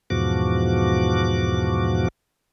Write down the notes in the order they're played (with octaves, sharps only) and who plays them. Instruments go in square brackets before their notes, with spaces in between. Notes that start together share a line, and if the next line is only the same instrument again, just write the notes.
[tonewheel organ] E2 G#2 B2 F3 F#4 D6